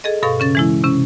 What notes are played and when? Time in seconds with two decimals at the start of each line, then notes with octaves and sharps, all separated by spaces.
0.04 G#4 A4 D#5
0.23 G2 B2 A4 F5 C#6
0.40 C#3 C#4 A6
0.55 E3 G#3 E4
0.84 C3 C#4